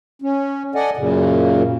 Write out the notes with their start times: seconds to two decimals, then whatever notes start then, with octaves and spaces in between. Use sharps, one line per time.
0.22 C#4
0.75 A4 D5 D#5 F#5 G#5
0.97 F#2 A#2 C#3